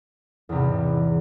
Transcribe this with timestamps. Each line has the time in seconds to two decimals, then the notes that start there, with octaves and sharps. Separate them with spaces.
0.49 E2
0.52 C3
0.55 G#2